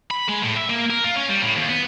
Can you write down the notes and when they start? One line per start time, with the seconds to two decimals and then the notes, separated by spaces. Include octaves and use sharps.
0.11 B5
0.28 G#3
0.43 A2
0.56 E5
0.70 A#3
0.90 A#4
1.05 F4
1.16 C#4
1.29 G3
1.42 A2
1.57 D#2
1.69 B3